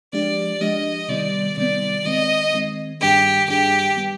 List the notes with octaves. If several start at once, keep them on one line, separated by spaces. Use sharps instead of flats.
F3 G#3 D4 G4 D5
F3 G#3 D4 G4 D#5
C3 D#3 G3 B3 D5
C3 D#3 G3 B3 D5
D#3 G#3 C4 D#5
D#3 G#3 C4
G2 D#3 G3 D4 G4 G#4
G2 D#3 G3 D4 G4 G#4
G3 B3